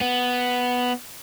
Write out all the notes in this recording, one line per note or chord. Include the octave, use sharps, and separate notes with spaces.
B3